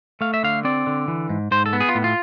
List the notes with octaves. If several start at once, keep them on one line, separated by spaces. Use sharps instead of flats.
A3 F5
E5
D3 F5
C4 D5
D3
E3
G#2
G#2 C5
A4
B3
G#4
F4
A2
F4